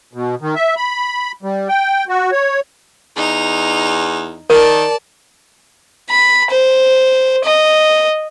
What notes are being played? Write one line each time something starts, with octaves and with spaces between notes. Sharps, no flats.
B2
D#3
E5
B5
G3
G5
F#4
C#5
E2 D#4 F7
D#3 A#4 D5 A5
B5
C5
D#5